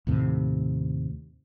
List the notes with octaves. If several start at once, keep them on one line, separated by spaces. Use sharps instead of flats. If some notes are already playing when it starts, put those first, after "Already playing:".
D#2 A2 C3